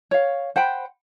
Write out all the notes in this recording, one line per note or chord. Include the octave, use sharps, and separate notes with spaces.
C#5 F5
C5 F#5 G5 B5